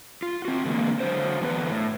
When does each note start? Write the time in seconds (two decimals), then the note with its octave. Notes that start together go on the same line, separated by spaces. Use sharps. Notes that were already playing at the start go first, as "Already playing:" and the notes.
0.22 F4
0.45 C4 F#4
0.65 D3 E3 G#3 A#3
1.00 D3 F#3 C5
1.41 D3 E3 B3 B4
1.70 A2